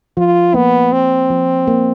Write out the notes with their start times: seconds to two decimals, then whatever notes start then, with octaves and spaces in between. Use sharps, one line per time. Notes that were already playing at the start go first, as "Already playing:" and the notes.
0.17 F3 F4
0.54 A#3 B3
0.92 A#3 C4
1.30 F3
1.68 A#3